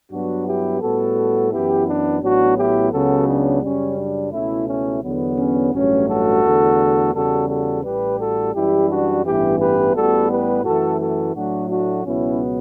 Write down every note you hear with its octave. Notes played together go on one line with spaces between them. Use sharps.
G2 F#3 B3 D4 F#4
E4 G4
A2 G3 B3 F#4 A4
F#2 E3 B3 E4 G4
D4
A1 A2 F#3 B3 D4 F#4
E4 G4
C#2 C#3 F#3 B3 F#4 A4
D4
F#2 C#3 G3 C#4
D4
C#2 B2 A3 C#4 E4
C#4 E4
E2 D3 F#3 B3
C#4
A1 G2 F#3 A3 C#4
F#4 A4
E2 D3 A3
E2 C#3 G3 F#4 A4
F#4 A4
A1 A2 G3 G4 B4
F#4 A4
F#2 E3 G3 E4 G4
D4 F#4
A1 G2 E3 B3 E4 G4
G4 B4
A1 A2 G3 B3 F#4 A4
G4 B4
F#2 E3 A3 F#4 A4
F#4 A4
A2 F#3 A3 D4 F#4
D4 F#4
C#2 B2 F#3 B3 C#4 E4